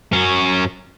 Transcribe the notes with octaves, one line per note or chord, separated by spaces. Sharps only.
F#2 C#4